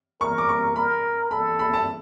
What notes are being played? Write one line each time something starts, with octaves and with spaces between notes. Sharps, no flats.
A#4 C#6
D6
C#6
A#4 B5
A4 B5
B5
A5